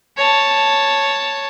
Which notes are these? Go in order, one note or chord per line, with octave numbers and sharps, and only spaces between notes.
C#5 A5